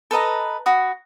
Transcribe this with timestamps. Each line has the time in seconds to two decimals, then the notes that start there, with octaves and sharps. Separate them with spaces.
0.11 A4 B4 D#5 A#5
0.66 F#4 B5 D#6